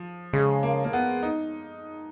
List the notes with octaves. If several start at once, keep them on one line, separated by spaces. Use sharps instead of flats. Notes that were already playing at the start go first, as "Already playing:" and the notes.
Already playing: F3
C#3 G#3
A#3
A#3
B3
D#4